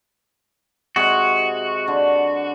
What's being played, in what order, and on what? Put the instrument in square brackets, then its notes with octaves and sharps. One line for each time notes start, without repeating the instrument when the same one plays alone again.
[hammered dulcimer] C3 G#3 [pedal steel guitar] F#4
[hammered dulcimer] D3